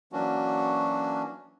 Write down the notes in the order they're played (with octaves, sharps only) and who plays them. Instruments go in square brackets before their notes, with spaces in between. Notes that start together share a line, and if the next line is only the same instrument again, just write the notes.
[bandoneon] E3 F#3 A#3 C#4 D4 F#4